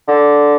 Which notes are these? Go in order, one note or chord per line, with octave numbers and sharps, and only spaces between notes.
D3